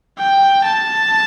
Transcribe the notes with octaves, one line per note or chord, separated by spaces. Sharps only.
G5
A5